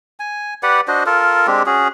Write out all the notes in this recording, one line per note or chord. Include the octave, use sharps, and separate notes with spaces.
G#5
G4 B4 D5 F#5
D4 F#4 C5 D#5
F4 A4 A#4
G#3 C4 D4 G4
C#4 F#4 G#4